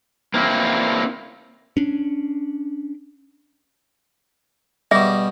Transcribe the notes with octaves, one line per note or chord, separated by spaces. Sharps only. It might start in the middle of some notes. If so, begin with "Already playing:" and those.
A#3 C4 E4
C#4 D4
B2 G3 G#4 E5